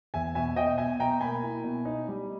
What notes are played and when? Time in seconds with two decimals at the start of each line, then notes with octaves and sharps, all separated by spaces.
0.14 E2 E5 G#5
0.35 B2 E5 G#5
0.56 B2 D#5 G5
0.78 B2 E5 G#5
0.99 B2 G5 A#5
1.21 A#3 G#5 B5
1.43 E4
1.64 B2
1.85 D#4
2.08 G3